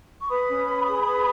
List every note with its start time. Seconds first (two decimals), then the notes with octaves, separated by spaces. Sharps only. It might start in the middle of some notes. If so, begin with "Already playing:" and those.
0.20 C#6
0.28 B4 B5 D#6
0.48 C#4
0.67 B4
0.86 G#4
1.05 B4